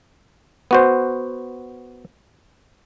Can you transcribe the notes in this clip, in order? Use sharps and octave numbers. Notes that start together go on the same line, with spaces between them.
B3 F#4 C5